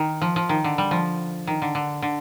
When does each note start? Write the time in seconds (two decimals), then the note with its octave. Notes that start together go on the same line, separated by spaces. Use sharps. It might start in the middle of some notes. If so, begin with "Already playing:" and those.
Already playing: D#3
0.22 F3
0.36 F3
0.49 D#3
0.64 D3
0.78 G3
0.91 F3
1.47 D#3
1.62 D3
1.75 D3
2.02 D3